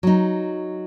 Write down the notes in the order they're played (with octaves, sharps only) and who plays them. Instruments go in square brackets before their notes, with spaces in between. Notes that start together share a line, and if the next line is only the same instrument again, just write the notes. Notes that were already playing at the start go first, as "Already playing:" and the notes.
[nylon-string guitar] F#3 D#4